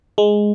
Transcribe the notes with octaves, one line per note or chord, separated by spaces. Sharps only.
G#3